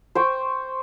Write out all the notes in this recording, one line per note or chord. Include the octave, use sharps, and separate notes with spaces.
C5 G5 C#6